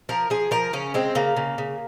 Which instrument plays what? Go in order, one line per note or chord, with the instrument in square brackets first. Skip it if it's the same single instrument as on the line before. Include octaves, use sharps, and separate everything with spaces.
[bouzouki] F3 A#4
F3 G#4
F3 A#4
C#3 C#4
G#3 C4
C#3 A#3
C#3
C#3